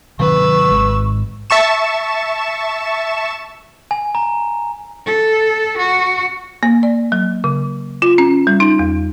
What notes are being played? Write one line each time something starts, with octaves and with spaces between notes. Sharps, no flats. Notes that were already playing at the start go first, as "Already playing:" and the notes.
C3 D#3 F#3 B4 C#6 E6
G#1 G#3
E5 A5 C#6 E7
G#5
A#5
A4
F#4
A#3
D5
F#3
C#3
F4
C#4
G3
D#4
E2